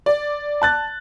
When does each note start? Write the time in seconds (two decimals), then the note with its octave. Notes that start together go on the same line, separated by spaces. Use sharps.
0.06 D5
0.62 A5 F#6 A6